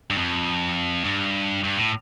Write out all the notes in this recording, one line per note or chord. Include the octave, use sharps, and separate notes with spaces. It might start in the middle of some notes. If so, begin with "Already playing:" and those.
G2
F2
G2
G2
A2